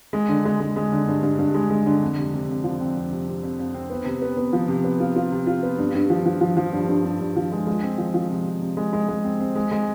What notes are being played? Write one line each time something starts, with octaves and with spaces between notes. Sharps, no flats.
G#3
D3
G#3
G#3
G#3
D3
G2
G2
G2
G#3
G#3
D3
F2
C3
C3
F2
F3
C4
F2
C3
C3
F2
F2
C4
B3
C3
B3
B3
F3
C3
B3
F4
F4
C3
F4
B3
G2
G2
F3
F3
F3
F3
G2
G2
G2
G2
F3
G#3
G#3
C4
F3
F3
C3
C3
C3
G#3
G#3
G#3
C4
C4
G#3
G#3